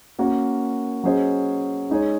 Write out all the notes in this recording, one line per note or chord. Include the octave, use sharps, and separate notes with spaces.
A#3 C#4 F#4
F#3 C#4 G#4 C5 D#5
G#3 D#4 G#4 C#5